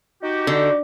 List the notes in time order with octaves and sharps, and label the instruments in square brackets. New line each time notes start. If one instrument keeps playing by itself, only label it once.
[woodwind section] D#4 F#4 G4
[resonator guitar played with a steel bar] D3